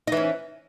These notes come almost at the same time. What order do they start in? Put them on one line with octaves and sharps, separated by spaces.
D#4 E3 C#4